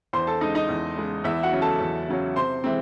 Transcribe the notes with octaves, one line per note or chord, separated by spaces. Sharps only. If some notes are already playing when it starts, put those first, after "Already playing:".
E2 C5 C6
A4 A5
C#3 G#3 D#4 D#5
D#4 D#5
E2
C#3 G#3
E2 E4 E5
F#4 F#5
C#3 F#3 C#4
A4 A5
E2
C#3 F#3 C#4
C3 C5 C6
E3 G#3 C4